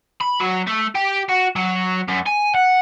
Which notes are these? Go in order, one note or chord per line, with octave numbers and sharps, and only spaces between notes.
B5
F#3
A3
G4
F#4
F#3
F#2
G#5
F#5